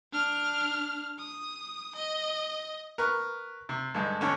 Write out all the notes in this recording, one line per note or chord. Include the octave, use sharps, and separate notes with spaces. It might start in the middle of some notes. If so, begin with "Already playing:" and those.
D4 F6
D#6
D#5
A#4 B4 C#6
C3
G2 D3 G#3
E2 D3 C#4